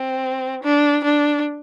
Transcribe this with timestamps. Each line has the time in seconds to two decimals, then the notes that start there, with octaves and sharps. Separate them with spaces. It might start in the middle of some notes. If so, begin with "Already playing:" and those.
Already playing: C4
0.63 D4
1.04 D4